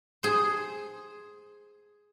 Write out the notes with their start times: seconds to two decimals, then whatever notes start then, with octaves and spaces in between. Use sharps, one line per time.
0.23 G#4 C5